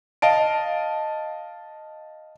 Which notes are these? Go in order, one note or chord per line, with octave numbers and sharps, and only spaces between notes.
D#5 F5 A5 D7